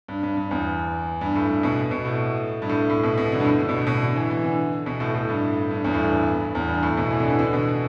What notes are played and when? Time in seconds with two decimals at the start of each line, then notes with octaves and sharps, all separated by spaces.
0.08 G2
0.23 G2
0.37 G2
0.51 E2
1.21 G2
1.36 A2
1.49 G2
1.63 B2
1.91 B2
2.05 A2
2.62 G2
2.69 A2
2.75 G2
2.90 A2
3.04 B2
3.18 B2
3.32 D3
3.40 G2
3.46 A2
3.60 D3
3.69 B2
3.77 A2
3.87 B2
4.02 D3
4.16 E3
4.30 E3
4.44 D3
4.86 B2
5.00 A2
5.15 A2
5.29 G2
5.71 G2
5.84 E2
5.94 A2
5.99 G2
6.55 E2
6.68 G2
6.83 A2
6.97 B2
7.11 E3
7.20 D3
7.30 E3
7.39 D3
7.53 B2